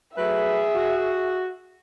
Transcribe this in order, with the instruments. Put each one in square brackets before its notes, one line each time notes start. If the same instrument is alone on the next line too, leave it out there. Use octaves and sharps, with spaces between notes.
[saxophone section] F#3 A3 B4 [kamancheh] G#4 E5
[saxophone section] F#4